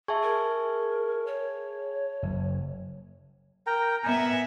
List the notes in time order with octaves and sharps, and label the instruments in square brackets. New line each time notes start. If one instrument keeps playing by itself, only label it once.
[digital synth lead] G#4 [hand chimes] E5 A5 C#6
[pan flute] A#4
C#5
[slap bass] F#1
[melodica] A#4 G5 A#5
[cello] B3 E5 [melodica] G#5 A#5